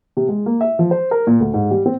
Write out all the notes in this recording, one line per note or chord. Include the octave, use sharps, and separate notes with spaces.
C3
G#3
A#3
E5
F3
C5
A#4
A#2
D2
G#2
G3
C4